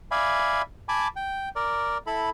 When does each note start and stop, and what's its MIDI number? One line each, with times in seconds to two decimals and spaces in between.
0.11 0.62 74
0.11 0.62 76
0.11 0.62 77
0.11 0.62 80
0.11 0.62 83
0.89 1.08 80
0.89 1.08 81
0.89 1.08 83
0.89 1.08 86
1.16 1.49 79
1.56 1.98 70
1.56 1.98 74
2.07 2.30 64
2.07 2.30 69
2.07 2.30 83